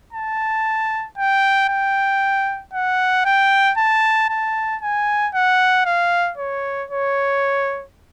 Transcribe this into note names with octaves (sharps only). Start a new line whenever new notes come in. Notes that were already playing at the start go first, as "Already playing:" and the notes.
A5
G5
G5
F#5
G5
A5
A5
G#5
F#5
F5
C#5
C#5